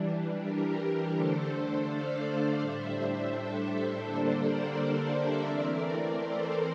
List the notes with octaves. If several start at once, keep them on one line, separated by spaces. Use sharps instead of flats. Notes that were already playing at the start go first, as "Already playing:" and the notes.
Already playing: E3 G3 D4
G4 A#4
D3 A3 D4 A4 C5
D5 F5
A2 G3 D4 C5 E5
A4 C5
D3 G3 A#3 D4 A4 C5
A#4 D5
C5 E5
E3 A3 C4 A#4 D5
A4 C5